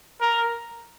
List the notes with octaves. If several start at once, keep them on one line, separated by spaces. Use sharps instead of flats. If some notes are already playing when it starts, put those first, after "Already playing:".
A#4